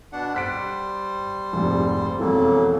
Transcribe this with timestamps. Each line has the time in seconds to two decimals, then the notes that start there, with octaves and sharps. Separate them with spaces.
0.12 B2 D4 F#5
0.34 G3 C5 F#6 B6 D7
1.53 F1 A#1 G#2
2.20 E1 F2 C#3 E3 F#3 A#3 A4